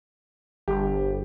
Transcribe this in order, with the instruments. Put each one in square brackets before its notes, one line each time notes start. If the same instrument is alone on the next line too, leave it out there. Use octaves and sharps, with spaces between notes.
[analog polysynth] G1 [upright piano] G4